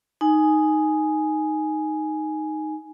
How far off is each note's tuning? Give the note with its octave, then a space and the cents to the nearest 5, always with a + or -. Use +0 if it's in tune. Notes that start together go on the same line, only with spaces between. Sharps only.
D#4 +0 G#5 +5